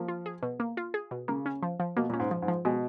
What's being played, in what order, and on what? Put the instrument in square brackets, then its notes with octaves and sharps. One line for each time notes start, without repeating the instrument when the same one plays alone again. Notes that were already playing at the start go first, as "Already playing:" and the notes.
Already playing: [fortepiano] F3 [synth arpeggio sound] A#3
[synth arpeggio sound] F4
G#4
B2
A#3
F4
G#4
B2
[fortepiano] C#3 [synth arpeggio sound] A#3
[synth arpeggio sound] C#4
F3
F3
[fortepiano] B2 [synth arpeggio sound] A#3
[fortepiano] A#2 [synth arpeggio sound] C#4
[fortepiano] G#2
[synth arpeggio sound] F3
[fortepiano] G#2
[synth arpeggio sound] F3
[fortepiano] B2 [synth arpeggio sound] G#3